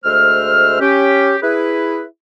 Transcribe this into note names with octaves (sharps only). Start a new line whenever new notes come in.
D2 G#3 A3 C5 E6 F6
C#4 G4
E4 G#4 B4